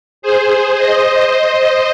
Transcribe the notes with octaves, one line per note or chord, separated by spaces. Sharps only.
G#4 C5
C5 D#5
C5 D#5